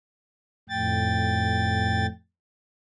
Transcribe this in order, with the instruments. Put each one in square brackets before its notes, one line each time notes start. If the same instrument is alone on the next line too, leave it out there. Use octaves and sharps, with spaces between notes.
[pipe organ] F2 A2 G5 A6